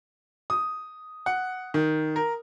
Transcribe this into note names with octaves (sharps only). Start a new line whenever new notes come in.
D#6
F#5
D#3
A#4